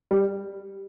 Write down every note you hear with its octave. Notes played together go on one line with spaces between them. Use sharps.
G3